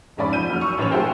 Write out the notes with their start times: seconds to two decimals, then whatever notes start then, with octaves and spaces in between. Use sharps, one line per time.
0.17 F1 G#2 C#4 D5 B5
0.33 F3 G6 D#7
0.49 F#1 F#3 F6
0.61 C#6 E6
0.78 A1 F#2 B4 C#5 F7
0.91 A3 F#4 G#4 A#4 C5 G5